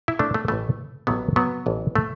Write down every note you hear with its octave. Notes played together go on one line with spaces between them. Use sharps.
E4
A3 D4
A3
A1 A2 E3 A3
A1 A2 E3 F#3 B3
F#3 B3
A1 A2 E3
A3